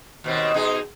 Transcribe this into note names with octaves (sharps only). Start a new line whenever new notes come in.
D#2 B2 C4
B2 D#4 G#4